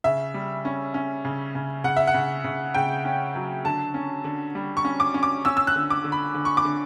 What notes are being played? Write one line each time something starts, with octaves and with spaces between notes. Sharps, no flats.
C#3 E5
G3
C#4
C#4
C#3
C#3
C#3 F#5
E5
F#5
C#3
C#3
C#3 G5
C#4
F#3
D3 A5
C#4
D3
G3
C#6
C#4
D6
C#4
D6
C#4 E6
E6
F#6
D3
D6
D3
B5
D3
C#6
D6
D3